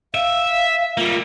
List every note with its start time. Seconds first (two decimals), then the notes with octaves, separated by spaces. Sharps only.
0.14 E5 F5
0.98 G3 A#3 F4